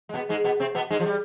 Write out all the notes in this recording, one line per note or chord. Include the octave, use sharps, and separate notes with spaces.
G#3
B2 B3
G#2 G#3
B2 B3
C3 C4
B2 B3
G#2 G#3
F3
G3